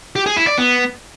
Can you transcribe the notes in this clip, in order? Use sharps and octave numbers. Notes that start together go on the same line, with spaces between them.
G4
G#4
E4
D5
B3